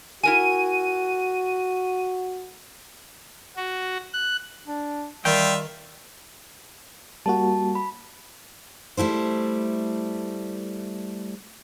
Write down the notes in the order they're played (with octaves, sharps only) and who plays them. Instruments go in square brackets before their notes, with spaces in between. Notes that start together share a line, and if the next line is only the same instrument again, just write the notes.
[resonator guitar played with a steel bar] E4 A#4 G#5 [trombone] F#4 [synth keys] D#7
[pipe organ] F#4
F#6
[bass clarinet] D4
[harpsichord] D#3 A5 [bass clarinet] G3 [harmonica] F4 E5 [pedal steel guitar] G5
[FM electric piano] G3 A#3 F#4 [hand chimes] A5
[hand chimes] B5
[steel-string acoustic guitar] G3 A3 E4 C5